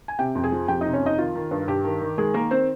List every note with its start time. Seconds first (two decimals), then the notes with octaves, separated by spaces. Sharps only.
0.08 G#5
0.19 C3 G4 G5
0.35 F2
0.44 G#4 G#5
0.52 F3
0.68 F2 G4 G5
0.81 C3 D#4 D#5
0.93 C#4 C#5
1.02 F2 D#4 D#5
1.18 D#3 F4
1.35 D#3
1.51 G2
1.68 G2 G4
1.84 D#3
2.01 D#3
2.18 D#3 G#3 G#4
2.34 D#3 A#3 A#4
2.51 C4 C5